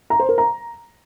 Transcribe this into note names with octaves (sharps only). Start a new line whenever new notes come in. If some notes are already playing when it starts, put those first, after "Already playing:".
A#5
C5
A#4
A#5